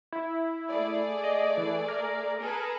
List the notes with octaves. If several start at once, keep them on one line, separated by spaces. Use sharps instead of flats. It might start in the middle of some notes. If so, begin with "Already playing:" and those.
E4
A3 G#4 D5
D#5
E3
A#4
G#4 A4 B4